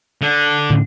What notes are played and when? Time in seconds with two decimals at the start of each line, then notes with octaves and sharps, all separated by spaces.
0.22 D3
0.70 A2 D3